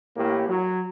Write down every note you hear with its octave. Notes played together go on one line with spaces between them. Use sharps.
A1 A2 A#3 G4
F#3